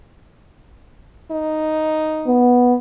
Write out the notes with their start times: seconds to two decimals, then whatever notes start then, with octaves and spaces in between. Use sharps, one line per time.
1.31 D#4
2.28 B3